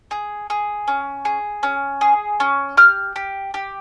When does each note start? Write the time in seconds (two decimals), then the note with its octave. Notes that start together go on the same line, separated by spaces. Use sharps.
0.11 G#4
0.50 G#4
0.88 C#4
1.25 G#4
1.63 C#4
2.01 G#4
2.40 C#4
2.77 G4 F6
3.16 G4
3.54 G4